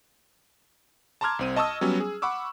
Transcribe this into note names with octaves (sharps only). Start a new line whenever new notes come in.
A5 A#5 C6 D6 F6 G#6
C2 C4 D#7
D#5 A5 C#6 D#6 E6
F#3 G3 B3 C#4
G#4
F#5 B5 C#6 D6 E6